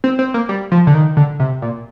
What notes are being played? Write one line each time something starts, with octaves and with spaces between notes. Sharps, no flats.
C4
C4
A#3
G3
F3
D3
D#3
D3
C3
A#2